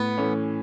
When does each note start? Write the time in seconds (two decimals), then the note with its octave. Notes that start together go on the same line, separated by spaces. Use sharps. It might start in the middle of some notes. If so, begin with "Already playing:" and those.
Already playing: A2 B3
0.18 E3 A3 C#4